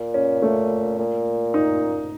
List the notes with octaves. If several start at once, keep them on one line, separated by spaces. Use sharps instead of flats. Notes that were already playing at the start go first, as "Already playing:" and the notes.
Already playing: A#2
C#4
A3
A#2
D#4